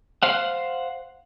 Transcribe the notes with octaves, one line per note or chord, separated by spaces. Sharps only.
C5 F5 F#5